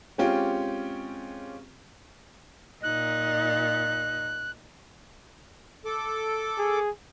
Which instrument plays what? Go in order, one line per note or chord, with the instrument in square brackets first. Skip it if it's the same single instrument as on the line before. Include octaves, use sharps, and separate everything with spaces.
[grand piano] G#3 C4 C#4 F4 G4
[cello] A#2 D#4 [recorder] F#6
[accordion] A4 D6
[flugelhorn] G#4